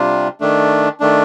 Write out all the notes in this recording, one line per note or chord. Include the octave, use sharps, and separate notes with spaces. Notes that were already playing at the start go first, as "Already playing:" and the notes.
Already playing: C3 G3 D4 F4
D#3 A3 D4
D#3 A3 D4